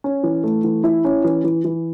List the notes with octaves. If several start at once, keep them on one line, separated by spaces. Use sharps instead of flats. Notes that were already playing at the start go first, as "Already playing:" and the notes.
C#4
E3
A3
E3
E4
C#4
E3
E3
E3